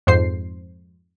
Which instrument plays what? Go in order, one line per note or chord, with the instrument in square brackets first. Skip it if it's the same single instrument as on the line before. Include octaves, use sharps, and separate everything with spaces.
[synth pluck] F2 G#2 C5 C7